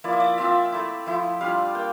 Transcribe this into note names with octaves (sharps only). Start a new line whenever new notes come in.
F3 A#3 E4 D5
E5
D5
F3 C4 F4 E5
A3 E4
F3 A3 E4
G3 D4 F4 F5
A#3 G5